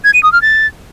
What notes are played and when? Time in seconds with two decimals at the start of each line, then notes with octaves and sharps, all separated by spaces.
0.04 G#6
0.14 D#7
0.23 D#6
0.33 F6
0.42 A6